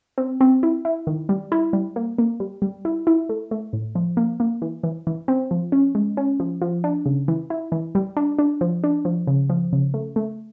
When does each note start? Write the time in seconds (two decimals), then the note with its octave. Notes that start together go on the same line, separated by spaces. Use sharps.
0.18 C4
0.41 C4
0.63 E4
0.85 E4
1.07 D#3
1.29 G3
1.52 E4
1.73 G3
1.96 A#3
2.18 A#3
2.40 G3
2.62 G3
2.85 E4
3.07 E4
3.29 A3
3.51 A3
3.73 A2
3.95 F3
4.17 A#3
4.40 A#3
4.62 E3
4.83 E3
5.07 E3
5.28 C4
5.51 F3
5.72 C#4
5.95 G#3
6.17 C#4
6.40 F3
6.62 F3
6.84 D4
7.06 C#3
7.28 E3
7.50 E4
7.72 E3
7.95 G3
8.17 D4
8.39 D4
8.61 F3
8.84 D4
9.05 F3
9.27 C#3
9.50 F3
9.73 C#3
9.94 A3
10.16 A3